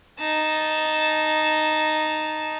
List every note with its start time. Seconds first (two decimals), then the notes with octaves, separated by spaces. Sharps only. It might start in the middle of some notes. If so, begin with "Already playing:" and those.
0.20 D#4 A5